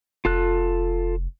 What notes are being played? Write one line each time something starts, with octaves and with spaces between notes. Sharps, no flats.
F1 F4 A4 F#6